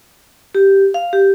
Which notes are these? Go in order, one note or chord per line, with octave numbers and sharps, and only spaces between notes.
G4
F5
G4